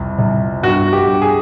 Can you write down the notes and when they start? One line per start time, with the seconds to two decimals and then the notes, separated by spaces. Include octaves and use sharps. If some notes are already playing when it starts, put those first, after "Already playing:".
Already playing: C2 F2
0.19 C2
0.63 G2 F#4
0.93 G4
1.07 G2
1.22 G#4